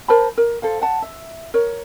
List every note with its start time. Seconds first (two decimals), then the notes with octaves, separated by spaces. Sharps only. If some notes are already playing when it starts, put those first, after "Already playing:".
0.08 A#4 C5 A5 B5
0.37 A#4
0.62 A4 C5 F5
0.81 F#5 A5
1.02 E5
1.54 A#4 C#5